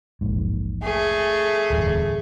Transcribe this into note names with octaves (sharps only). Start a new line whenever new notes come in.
E1 A#1 G#2
A3 G#4
D1 E2 G2